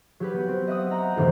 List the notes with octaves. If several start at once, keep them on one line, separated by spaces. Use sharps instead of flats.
F#3 G4 B4
B3
C4
D#5 E5 F#5 D#6
F#5 G5 A#5 B5
F#2 A2 C3 D#3 E3 C4